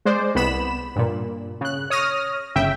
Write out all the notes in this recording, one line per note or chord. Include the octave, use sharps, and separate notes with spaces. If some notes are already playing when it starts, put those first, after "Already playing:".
G#3 C5 D5
C2 B3 B5 E7
G2 A#2
C#3 F#6
C#5 D#6 F6 A#6
G1 C#3 E5 G5